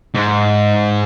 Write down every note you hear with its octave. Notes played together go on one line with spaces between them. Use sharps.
G#2